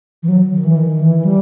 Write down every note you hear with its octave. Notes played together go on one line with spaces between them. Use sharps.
E3
F#3
D#3
E3
D#3
E3
G3